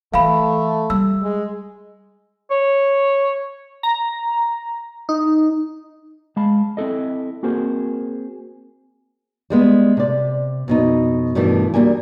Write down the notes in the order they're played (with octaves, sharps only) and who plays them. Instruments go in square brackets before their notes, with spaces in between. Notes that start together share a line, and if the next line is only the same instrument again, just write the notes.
[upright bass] E3 F4 [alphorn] A3 [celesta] F5 B5
[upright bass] G3 [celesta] E6
[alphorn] G#3
[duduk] C#5
[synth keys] A#5
D#4
[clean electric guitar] G#3 F5 A5 B5
C4 E4 A4 D#5
A#3 C4 F#4 G#4 A#4 C5
[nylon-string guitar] G3 G#3 B3
C3 D5
F2 B2 D#4
G2 B2 D#3 E3 A3 E4
D2 G3 A#3 G#5